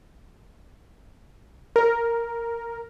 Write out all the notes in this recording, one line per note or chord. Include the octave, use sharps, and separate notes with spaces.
A#4